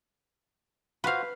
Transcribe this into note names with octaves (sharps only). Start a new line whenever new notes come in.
F4 F#4 B4 C5 F5